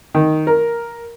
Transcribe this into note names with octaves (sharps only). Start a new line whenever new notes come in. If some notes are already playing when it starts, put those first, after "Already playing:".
D#3
A#4